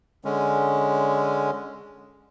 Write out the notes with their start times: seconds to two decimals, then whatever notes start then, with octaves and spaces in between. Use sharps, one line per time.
0.25 D3 G#3 C#4